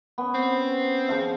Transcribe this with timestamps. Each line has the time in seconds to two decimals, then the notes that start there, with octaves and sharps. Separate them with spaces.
0.18 B3 C#4
0.34 C4
1.09 C#3 F3 F5